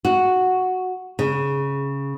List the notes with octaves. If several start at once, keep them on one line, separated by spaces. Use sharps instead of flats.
F#4
C#3